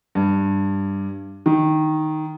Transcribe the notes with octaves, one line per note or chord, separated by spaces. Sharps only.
G2
D#3